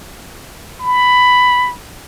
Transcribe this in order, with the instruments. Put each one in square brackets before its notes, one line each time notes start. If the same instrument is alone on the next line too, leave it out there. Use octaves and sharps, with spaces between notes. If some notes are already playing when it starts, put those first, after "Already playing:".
[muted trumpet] B5